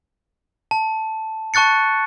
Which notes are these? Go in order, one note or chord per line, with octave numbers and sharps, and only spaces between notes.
A5
A5 C#6 F#6 A6 C#7